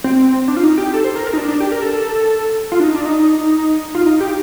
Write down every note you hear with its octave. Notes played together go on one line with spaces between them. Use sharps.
C4
D4
F4
D#4
G4
A4
C5
A#4
A#4
D#4
D4
D4
G4
A#4
A4
F4
D4
D#4
D4
D#4
F4
D#4
G4